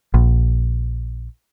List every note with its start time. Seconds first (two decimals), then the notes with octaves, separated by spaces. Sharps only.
0.14 A#1